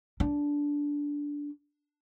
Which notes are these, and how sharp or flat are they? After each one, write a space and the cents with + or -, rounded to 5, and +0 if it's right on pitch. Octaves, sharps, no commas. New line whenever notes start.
D4 -15